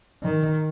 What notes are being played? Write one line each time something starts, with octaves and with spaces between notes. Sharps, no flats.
D#3